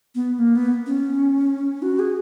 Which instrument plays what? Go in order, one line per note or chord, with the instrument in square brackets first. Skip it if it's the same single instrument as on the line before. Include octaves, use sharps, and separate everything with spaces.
[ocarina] B3
A#3
B3
C#4
F#4
G#4